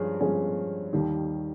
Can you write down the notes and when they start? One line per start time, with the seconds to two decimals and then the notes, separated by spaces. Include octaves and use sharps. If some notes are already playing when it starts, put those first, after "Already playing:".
Already playing: G2 F3 G#3 C#4 G#4
0.20 G2 F3 G#3 C#4 G#4
0.93 D#2 D#3 G3